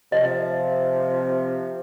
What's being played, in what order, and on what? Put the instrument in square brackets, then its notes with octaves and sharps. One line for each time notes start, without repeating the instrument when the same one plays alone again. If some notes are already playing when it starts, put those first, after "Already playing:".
[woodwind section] C3 F3 [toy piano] D#5